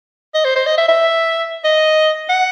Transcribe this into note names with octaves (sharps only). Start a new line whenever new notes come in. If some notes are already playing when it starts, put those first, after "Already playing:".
D#5
C5
C5
D#5
E5
E5
D#5
F#5